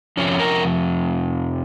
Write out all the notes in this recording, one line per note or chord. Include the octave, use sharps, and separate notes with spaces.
F2 C3 F3 C#4
A#4